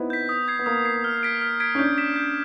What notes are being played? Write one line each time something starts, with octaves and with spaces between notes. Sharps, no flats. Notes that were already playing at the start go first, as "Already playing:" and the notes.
Already playing: B3 C4 D#4 E4
G6 B6
D#6
G#6 C7
B3
A#3 D#6
G#6 C7
F6
G#6 B6 D7
F6
G#6 B6 D7
C#4
D4 G6
B6 E7
G6